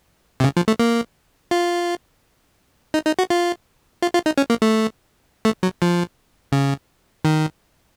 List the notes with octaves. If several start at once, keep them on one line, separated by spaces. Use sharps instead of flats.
C3
C#3
F3
A3
A#3
F4
D#4
D#4
F#4
F4
F4
F4
D#4
C#4
A#3
A3
A3
F#3
F3
C#3
D#3